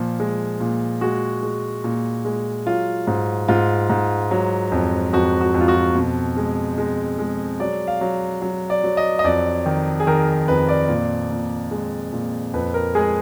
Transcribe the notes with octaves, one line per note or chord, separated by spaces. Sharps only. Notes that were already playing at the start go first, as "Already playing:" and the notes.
Already playing: A#2 F3
G#3
A#2
G#3 F#4
G#3
A#2
G#3
F#3 F4
G#2
G#2 F4
G#2
F#3
F2
F2 F#4
F#4
F2
F4
F#4
B2
G#3
G#3
G#3
F#3 D5
F5
F#3
F#3
D5
F#3
D#5
D#5
F2 D5
D#3
G#4
D#3 A#4
F2 B4
D5
A#2
A#2
G#3
A#2
F2 B4
A#4
G#3 G#4